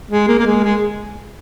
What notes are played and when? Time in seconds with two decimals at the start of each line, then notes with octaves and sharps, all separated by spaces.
0.11 G#3
0.28 A#3
0.39 A#3
0.46 G#3
0.64 G#3